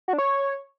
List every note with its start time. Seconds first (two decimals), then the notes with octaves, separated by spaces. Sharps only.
0.08 F#4
0.13 D4
0.18 C#5